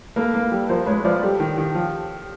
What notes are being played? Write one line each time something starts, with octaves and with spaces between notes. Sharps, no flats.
A#3 A4 B4
A#3
G3
F3 A#4 C5
G#3 B4 C#5
F3 C5 D5
G3 G4 A4
D#3
D#3
F3